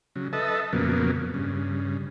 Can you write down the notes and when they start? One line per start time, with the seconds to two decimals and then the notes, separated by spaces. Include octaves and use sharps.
0.16 C#3 F#3
0.33 A4 B4 D#5 E5 A5
0.73 F2 A#2 C#3 F#3 A#3 B3
1.34 G2 C#3